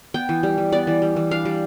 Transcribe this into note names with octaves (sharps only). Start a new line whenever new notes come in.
B3 G5
E3
G3
E3
B3 D5
E3
G3
E3
D4 F5
G3